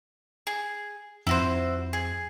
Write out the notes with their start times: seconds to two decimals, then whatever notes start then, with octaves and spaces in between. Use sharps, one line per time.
0.47 G#4
1.27 F2 E4 F#4 C5
1.93 G#4